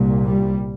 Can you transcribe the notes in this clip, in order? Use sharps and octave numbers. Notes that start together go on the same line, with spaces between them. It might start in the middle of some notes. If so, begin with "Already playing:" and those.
Already playing: C2 A#2
G3